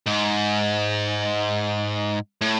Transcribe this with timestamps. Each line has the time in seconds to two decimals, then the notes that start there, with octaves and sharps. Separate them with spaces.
0.06 G#2
2.41 A2